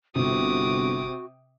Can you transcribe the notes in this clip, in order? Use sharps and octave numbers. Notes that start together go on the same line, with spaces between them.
G1 C3 F#4 D6 D#6